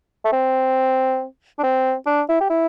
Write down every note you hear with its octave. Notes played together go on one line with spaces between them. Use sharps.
A3
C4
D4
C4
D4
E4
G4
E4